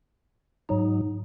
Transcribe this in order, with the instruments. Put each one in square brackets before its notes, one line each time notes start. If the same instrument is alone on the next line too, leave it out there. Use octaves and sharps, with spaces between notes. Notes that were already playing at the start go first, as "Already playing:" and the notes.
[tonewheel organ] G#2 F#3 D#4